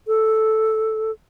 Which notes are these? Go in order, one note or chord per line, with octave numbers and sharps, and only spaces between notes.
A4